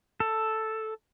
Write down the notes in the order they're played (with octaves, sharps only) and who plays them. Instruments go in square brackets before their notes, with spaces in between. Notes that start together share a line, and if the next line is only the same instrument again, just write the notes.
[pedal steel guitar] A4